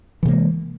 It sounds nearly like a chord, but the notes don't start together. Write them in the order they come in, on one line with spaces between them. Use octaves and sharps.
E3 C3 A#3 G#3